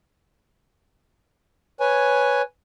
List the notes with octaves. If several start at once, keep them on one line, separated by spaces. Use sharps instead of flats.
B4 C#5 G#5